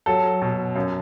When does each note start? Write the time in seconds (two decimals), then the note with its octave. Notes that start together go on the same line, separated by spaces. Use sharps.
0.06 F#3 A4
0.42 B2
0.76 F#2